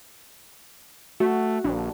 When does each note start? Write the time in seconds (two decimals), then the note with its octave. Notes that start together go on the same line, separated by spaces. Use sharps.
1.20 A3 F#4
1.64 A#1 D4